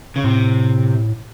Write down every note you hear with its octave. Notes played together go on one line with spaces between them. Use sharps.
C#3
A2 C3